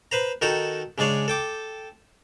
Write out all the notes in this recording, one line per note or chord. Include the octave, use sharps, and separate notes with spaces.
B4 C5 A#5
D#3 D#4 F#4 A4 G5 A#5
C#3 G#3 D4 G#4 C#5
A4 G5 D6